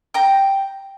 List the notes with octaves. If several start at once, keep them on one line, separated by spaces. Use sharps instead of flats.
G5 A#5